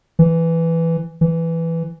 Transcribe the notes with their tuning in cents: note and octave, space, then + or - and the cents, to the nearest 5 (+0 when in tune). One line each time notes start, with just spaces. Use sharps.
E3 +5
E3 +5